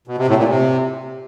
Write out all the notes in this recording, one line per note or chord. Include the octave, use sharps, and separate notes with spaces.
B2
C3
A2
A#2
C3